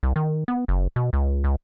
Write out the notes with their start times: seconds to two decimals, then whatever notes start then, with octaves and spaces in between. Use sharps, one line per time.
0.03 C2
0.16 D#3
0.48 B3
0.68 F#1
0.96 B2
1.13 C#2
1.44 C#2